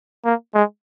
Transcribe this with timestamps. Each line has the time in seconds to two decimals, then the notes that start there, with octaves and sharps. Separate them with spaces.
0.25 A#3
0.54 G#3